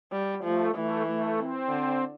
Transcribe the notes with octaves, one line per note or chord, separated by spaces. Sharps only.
G3
F3 A3
E3 A3
A3
C4
D3